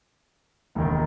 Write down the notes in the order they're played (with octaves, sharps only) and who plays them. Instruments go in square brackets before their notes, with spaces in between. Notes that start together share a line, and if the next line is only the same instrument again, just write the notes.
[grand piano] E1 D#2 D#3